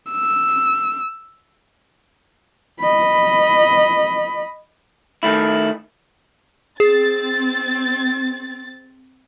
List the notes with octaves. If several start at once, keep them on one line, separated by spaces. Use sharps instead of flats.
E6
D#5 B5
D#3 A3 E4
C4 G#4 A6